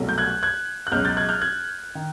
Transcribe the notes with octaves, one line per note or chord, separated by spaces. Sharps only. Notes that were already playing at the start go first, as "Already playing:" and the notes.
Already playing: C2 B2 F#3 A3
G6
F#6 G#6
F#6 G#6
F#6
C#2 B2 F#3 F6 G6
G6 A6
F#6 G#6
F6 G6
F#6 G#6
D#3